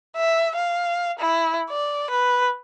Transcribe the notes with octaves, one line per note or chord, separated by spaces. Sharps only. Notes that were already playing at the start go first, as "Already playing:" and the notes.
E5
F5
E4
D5
B4